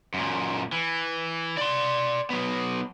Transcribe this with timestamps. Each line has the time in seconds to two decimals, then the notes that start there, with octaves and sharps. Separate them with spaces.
0.14 F#2 A#2
0.72 E3
1.57 D5 C6
2.30 F#3 B3